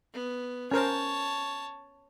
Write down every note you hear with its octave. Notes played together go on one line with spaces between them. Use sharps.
B3
C#4 A#4 C5 C#5 A5